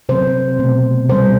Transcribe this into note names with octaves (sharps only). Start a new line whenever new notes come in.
C3 F#3 C4 C5
B2 A3 C4
C3 G3 C4 C5